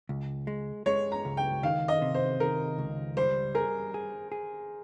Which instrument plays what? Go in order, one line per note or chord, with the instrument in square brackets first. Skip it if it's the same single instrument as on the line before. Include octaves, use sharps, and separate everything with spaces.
[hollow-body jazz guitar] C#2
G#3
[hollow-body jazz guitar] G#3 [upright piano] C#5
[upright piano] A#5
[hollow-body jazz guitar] C#2
[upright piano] G5
[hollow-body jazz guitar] D#3 [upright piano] F5
[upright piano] D#5
[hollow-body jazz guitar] C3
[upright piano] C5
[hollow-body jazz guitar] D#3 [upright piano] A#4
[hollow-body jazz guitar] C#2
[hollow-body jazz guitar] G3 [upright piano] C5
[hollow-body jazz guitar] G#4 [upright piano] A#4
[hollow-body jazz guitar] G#4
G#4